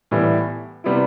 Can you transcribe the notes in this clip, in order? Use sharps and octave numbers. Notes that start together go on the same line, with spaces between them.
A2 E3 G3 B3
C3 G3 B3 E4